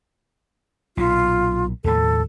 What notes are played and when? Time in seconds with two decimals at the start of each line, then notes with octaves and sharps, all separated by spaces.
0.97 B1 A#2 F4
1.84 D#2 A2 F3 A4